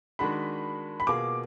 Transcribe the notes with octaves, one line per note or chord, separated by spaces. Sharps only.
D#3 G#3 D4 F#4 B5
B5
B2 A#3 F4 G#4 D6